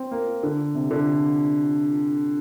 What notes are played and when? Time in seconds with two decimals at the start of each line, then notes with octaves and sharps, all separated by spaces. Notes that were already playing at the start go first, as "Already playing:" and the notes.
Already playing: C4
0.12 A#3
0.43 D3
0.75 C3
0.91 D3